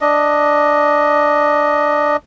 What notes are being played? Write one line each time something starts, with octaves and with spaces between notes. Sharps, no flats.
D4 D#5